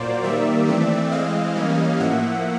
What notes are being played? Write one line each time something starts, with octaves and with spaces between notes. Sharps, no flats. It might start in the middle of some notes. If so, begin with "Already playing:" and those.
Already playing: A#2 F#3 A#3 C5 D5
D#3 G3 A#3 D5 E5
E3 A3 C4
E3 G#3 C4 D#5 F5
E3 G3 A#3 C#4
A2 F3 A#3 E5 F#5